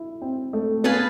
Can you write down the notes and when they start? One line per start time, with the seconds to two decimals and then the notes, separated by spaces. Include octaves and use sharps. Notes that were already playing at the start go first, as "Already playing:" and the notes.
Already playing: E4
0.22 C4
0.53 A3
0.84 B3 G#4 B4 F5 A5